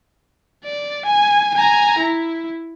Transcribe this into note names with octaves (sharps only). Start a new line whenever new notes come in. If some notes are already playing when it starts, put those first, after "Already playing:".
D5
G#5
G#5 A#5
E4